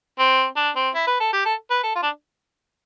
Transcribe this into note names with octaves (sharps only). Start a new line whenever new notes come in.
C4
D4
C4
E4
B4
A4
G4
A4
B4
A4
F4
D4